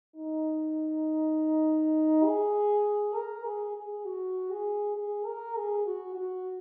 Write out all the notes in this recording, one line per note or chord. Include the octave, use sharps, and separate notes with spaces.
D#4
G#4
A#4
G#4
G#4
F#4
G#4
G#4
A#4
G#4
F#4
F#4